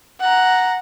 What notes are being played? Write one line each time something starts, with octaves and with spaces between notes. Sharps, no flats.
F#5 A#5